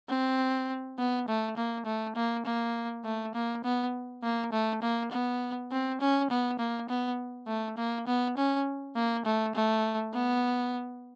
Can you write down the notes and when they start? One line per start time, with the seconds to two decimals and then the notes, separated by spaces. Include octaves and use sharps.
0.09 C4
0.99 B3
1.28 A3
1.57 A#3
1.86 A3
2.16 A#3
2.46 A#3
3.05 A3
3.35 A#3
3.64 B3
4.23 A#3
4.53 A3
4.82 A#3
5.11 B3
5.71 C4
6.01 C#4
6.30 B3
6.59 A#3
6.89 B3
7.48 A3
7.78 A#3
8.07 B3
8.37 C#4
8.96 A#3
9.25 A3
9.55 A3
10.14 B3